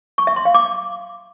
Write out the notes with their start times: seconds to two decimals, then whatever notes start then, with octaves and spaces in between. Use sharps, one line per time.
0.18 C#6
0.27 E5
0.36 C6
0.45 F5
0.54 D6